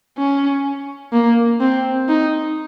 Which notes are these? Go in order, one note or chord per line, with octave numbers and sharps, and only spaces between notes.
C#4
A#3
C4
D#4